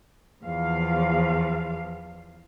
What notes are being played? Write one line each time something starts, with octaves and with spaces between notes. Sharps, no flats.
E2 F3 F5